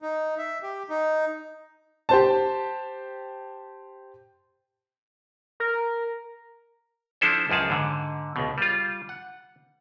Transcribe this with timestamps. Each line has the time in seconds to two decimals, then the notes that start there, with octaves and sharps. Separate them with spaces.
0.02 D#4
0.38 E5
0.63 G4
0.90 D#4
2.09 G4 C5 A5
5.60 A#4
7.21 F3 D4 E4 A4 C5
7.50 C#2 F#2 F3 G#4 A5
7.70 G#2 D3
8.36 C#2 B2
8.58 G3 F4
9.09 F#5